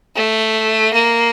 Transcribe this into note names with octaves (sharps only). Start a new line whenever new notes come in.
A3
A#3